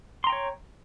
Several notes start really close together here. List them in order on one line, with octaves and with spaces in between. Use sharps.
C6 A#5 G5 C#5